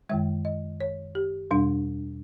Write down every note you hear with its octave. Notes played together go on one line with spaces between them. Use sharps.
F#2 D#3 G#3 E5
D#5
C#5
G4
E2 B2 G3 D4